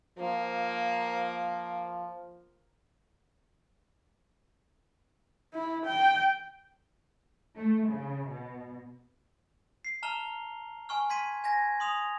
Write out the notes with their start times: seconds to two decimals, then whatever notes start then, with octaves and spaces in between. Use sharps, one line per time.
0.18 F3 A#3
5.54 E4
5.85 G5
7.57 A3
7.89 C#3
8.28 B2
9.85 C7
10.03 A5 A#5 F6 F7 G7
10.89 G#5 C#6 F6
11.10 C6 G#6 B6 D#7
11.44 G#5 G#6 A#6
11.80 C6 D#6 F7